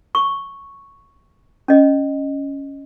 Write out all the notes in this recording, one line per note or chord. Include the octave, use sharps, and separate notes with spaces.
C#6
C#4 D#5